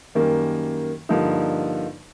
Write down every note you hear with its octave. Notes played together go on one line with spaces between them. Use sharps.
F#2 D#3 G3 A#3
G2 D3 F3 A#3 D#4